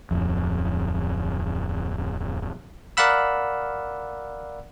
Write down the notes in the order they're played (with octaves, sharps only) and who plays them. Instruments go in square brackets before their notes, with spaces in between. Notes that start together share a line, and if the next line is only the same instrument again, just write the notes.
[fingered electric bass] D1 F2
[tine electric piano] A#4 D5 F5 F#5 B5 E6